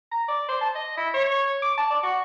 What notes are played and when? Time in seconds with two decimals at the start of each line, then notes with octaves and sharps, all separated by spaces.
0.12 A#5
0.28 D5
0.49 C5
0.61 A5
0.75 D#5
0.97 E4
1.14 C#5
1.62 D6
1.78 A5
1.90 D5
2.03 F#4